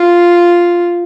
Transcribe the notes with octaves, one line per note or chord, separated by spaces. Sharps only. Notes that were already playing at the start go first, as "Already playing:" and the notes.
Already playing: F4